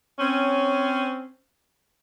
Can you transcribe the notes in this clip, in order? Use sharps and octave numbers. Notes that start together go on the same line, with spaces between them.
C4 C#4